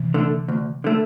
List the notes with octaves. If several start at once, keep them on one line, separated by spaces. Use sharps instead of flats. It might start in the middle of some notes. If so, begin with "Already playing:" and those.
Already playing: C3 E3
D3 A3
D2
D3 A3